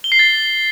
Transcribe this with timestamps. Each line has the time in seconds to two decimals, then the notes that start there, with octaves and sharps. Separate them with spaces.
0.04 G7
0.12 C7
0.19 A6